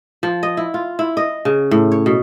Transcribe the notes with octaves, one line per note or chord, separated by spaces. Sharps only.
F3
D#5
E4
F4
E4
D#5
C#3
A2
C#5
B2